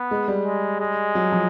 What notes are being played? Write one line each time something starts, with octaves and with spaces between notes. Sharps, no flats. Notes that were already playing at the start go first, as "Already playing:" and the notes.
Already playing: B3
G#3
G3
G#3
G#3
F#3
F3